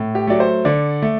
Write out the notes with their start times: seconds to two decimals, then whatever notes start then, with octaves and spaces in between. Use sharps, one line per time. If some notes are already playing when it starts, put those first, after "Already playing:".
Already playing: A2
0.15 G4
0.27 F#3 A3 D5
0.40 C5
0.65 D3 D5
1.02 A3